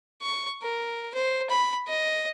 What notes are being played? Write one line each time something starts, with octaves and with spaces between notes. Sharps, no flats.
C#6
A#4
C5
B5
D#5